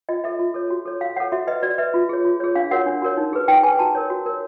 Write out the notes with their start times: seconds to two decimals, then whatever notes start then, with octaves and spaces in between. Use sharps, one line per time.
0.09 F4 D#5
0.24 A4 C#5 E5
0.39 F4
0.54 A4 C#5
0.71 F#4
0.85 A4 C#5
1.01 F#4 F5
1.16 A4 C#5 F#5
1.32 F#4 E5
1.47 B4 D#5
1.63 F#4 D5
1.78 B4 E5
1.94 F4
2.09 G#4 C#5
2.25 F4
2.40 G#4 C#5
2.55 D4 F5
2.71 F#4 A#4 C#5 F#5
2.86 D4
3.02 F#4 A#4 C#5
3.17 D#4
3.33 G#4 B4
3.48 D#4 G5
3.63 G#4 B4 G#5
3.79 F#4 A5
3.95 A#4 C#5
4.10 F#4
4.26 A#4 C#5